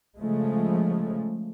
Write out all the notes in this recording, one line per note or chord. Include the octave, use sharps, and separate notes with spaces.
C#3 F3 G#3 A3